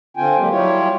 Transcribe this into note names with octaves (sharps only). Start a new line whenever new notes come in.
D3 C4 F4 G5 G#5
F#3 G#3 A#3 G4
F#3 G3 E4 F4 G4 C#5